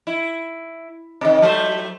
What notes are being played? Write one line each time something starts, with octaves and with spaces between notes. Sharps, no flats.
E4
C3 D#3
F#3 A3 C5